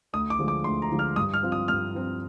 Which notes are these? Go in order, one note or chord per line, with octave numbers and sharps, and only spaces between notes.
D2 D#6
D6
D3 F3 G#3
D6
D2 C6
A#5
D3 F3 G#3
F6
G2 D#6
F6
F3 C4 F4
D#6
G2 F6
F3 C4 F4